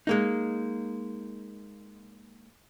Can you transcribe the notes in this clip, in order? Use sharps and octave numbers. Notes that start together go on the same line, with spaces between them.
G#3 A#3 D#4